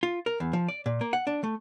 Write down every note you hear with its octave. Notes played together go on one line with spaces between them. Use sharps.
F4
A#4
E2
F3
D5
A#2
A#3
F#5
D4
A3